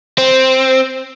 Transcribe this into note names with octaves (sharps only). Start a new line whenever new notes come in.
C4